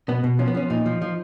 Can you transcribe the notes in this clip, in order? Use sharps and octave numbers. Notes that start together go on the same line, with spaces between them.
B2 B3
B2
F3 C#4
B3
F3 C#4
A#2 D#4
F3
F3